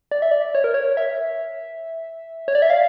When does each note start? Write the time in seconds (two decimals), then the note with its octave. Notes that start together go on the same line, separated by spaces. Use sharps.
0.11 D5
0.22 E5
0.31 D5
0.55 C#5
0.64 A#4
0.74 C#5
0.97 E5
2.48 C#5
2.55 D5
2.62 E5
2.70 F5